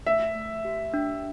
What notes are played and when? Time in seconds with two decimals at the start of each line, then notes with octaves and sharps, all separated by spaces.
0.06 A3 E5
0.35 A3
0.65 G4
0.94 D4